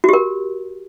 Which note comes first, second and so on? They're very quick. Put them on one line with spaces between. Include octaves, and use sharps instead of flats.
F#4 G4 A#4